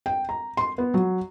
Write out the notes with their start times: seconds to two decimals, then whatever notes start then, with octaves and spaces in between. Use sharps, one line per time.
0.06 G5
0.29 A#5
0.57 C6
0.78 B3
0.94 F#3